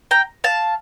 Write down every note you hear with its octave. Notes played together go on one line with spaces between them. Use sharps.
G5 A#5
F5 A5